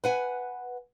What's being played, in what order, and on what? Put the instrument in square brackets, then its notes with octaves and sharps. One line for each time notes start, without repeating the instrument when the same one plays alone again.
[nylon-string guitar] B4 F#5 G#5